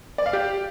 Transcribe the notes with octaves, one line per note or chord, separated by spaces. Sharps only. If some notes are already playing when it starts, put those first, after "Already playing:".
D5
F5
G4